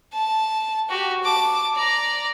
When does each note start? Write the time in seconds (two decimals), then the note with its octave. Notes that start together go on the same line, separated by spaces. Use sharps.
0.13 A5
0.89 F#4 G4
1.23 A5 D6
1.75 D5 A#5